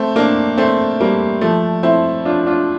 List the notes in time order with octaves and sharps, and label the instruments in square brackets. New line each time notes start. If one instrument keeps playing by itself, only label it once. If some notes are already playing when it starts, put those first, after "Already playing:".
Already playing: [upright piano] A3 C4
A#3 D4
A3 C4
G3 A#3
F3 A3
C4 E4
D4 F4
D4 F4